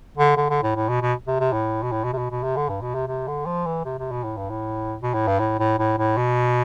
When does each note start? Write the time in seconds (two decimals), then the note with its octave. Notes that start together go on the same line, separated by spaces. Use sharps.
0.17 D3
0.37 D3
0.50 D3
0.63 A2
0.75 A2
0.89 B2
1.02 B2
1.27 C3
1.40 C3
1.53 A2
1.83 B2
1.92 A2
2.05 B2
2.13 C3
2.18 B2
2.31 B2
2.43 C3
2.57 D3
2.69 G2
2.82 B2
2.94 C3
3.08 C3
3.28 D3
3.46 F3
3.66 E3
3.85 C3
3.99 C3
4.11 B2
4.24 A2
4.37 G2
4.50 A2
5.02 B2
5.14 A2
5.27 G2
5.39 A2
5.59 A2
5.79 A2
5.98 A2
6.17 B2